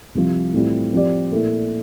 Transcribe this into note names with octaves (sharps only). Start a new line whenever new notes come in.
C2 C3 F3
A2 E3 G3 C4 F4
F3 C4 G4 D5
A#2 A3 E4